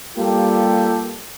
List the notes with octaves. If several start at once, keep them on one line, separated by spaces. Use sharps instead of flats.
G3 A#3 F4 G4 A4